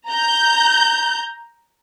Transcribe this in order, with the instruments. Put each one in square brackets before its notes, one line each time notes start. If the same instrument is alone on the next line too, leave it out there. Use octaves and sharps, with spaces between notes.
[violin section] A#5 G6